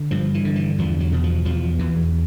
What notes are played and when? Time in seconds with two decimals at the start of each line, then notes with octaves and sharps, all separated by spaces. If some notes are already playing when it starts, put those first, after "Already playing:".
Already playing: D3
0.11 G2 F3
0.34 E3
0.45 D3
0.55 E3
0.78 E2 F3
1.00 F#3
1.12 B2
1.24 F3
1.45 E2 F3
1.79 E2 E3